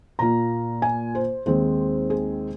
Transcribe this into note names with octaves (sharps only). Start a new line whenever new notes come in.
A#2 A#3 F4 A#5
G#5
C5
D#2 D#3 G#3 C4 C5
G#4